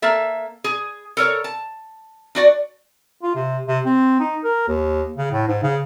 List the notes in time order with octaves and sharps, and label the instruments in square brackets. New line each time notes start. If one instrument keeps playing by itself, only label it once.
[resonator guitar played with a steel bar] A#3 A4 E5
G#4
A4 A#4 C#5
A5
D4 F#4 D5
[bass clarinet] F4
C3
C3
C4
D#4
A#4
D#2
C#3
A2
G#2
C#3